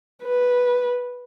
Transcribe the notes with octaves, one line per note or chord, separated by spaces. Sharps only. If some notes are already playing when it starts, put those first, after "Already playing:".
B4